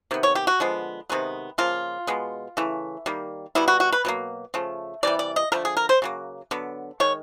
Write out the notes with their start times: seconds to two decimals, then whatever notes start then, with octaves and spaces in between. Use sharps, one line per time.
0.11 C3 D#3 B3
0.23 C#5
0.35 G4
0.47 F#4
0.60 D3 F3 G#3 B3
1.09 C3 D#3 G#3 B3
1.58 C#3 F3 A#3 F4
2.07 B2 G#3 B3
2.57 C#3 E3 A3
3.06 D#3 G3 A#3
3.55 B2 G3 B3 E4
3.68 F#4
3.80 F#4
3.92 B4
4.05 B2 F#3 A#3
4.54 C#3 F3 A3
5.03 C3 E3 G3 D5
5.19 D5
5.36 D#5
5.52 D3 F3 A3 A#4
5.65 G#4
5.77 A#4
5.89 C5
6.02 C#3 F#3 A#3
6.51 D3 F#3 B3
7.00 D#3 G#3 C#5